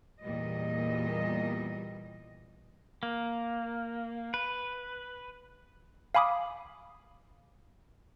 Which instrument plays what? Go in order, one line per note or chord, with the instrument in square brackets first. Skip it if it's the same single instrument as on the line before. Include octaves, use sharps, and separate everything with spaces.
[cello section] E2 A#2 G3 D#5
[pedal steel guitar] A#3
B4
[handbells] F5 G#5 B5 D6 D#6